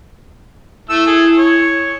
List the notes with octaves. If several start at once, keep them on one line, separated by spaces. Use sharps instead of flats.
A3 E4 A4 E6
G#4 A4
C#5